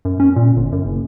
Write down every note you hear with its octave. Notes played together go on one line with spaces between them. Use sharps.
F#2
C#4
A#2
G1
F#2
F#1